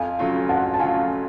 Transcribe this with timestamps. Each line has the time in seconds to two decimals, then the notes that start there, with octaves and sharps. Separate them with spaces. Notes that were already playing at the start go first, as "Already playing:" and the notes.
Already playing: F2 F5 G#5
0.19 C#3 F#3 A3 F4
0.49 F2 F#5 A5
0.74 A5
0.79 C#3 F#3 A3 F4 F5 G#5